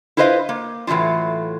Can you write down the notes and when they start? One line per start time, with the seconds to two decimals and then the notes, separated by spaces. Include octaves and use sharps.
0.17 E4 F4 B4 C5 D#5 F5
0.49 A#3
0.87 A2 E3 F#3 G3 F4